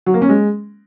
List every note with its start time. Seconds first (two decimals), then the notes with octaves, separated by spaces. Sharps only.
0.06 F#3
0.14 A#3
0.22 C#4
0.29 G#3